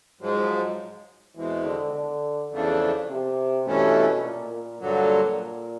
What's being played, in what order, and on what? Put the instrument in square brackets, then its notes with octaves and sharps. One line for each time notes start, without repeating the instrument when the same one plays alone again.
[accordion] G#2 F3 G#3 [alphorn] F#3
[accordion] E2 B2 G#3 C4 [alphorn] E3
[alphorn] D3
D3
[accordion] E2 C#3 F3 A3 D4
[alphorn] C3
[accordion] G2 E3 A3 C#4 [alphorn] B2
[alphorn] A#2
A#2
[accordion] G2 D3 F#3 [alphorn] A#2